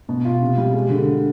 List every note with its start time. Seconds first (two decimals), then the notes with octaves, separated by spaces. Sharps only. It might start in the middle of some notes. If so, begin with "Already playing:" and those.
0.09 B2
0.25 F4
0.42 C3
0.58 G3
0.73 G#3
0.90 D3